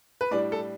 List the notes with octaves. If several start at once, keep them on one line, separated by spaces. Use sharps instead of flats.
B4
A2 G3 D4 D5
A4